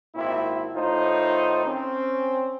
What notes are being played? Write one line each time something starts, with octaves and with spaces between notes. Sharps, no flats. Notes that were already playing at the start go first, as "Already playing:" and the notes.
G#1 A#2 C4 E4
A2 D#3 D#4 F4 C5
C4 C#4